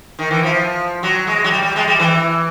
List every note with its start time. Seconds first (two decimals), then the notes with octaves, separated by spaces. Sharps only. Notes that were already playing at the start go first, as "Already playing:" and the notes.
0.19 D#3
0.31 E3
0.43 F3
1.03 F#3
1.27 G#3
1.44 F#3
1.51 G3
1.63 G3
1.76 G#3
1.87 G3
1.99 E3